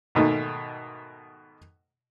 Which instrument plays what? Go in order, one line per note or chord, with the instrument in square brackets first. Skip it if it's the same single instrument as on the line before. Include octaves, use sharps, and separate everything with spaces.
[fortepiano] G#2 B2 D#3 A3